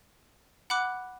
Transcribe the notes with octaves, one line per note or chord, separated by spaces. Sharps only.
F#5 B5 D6 F#6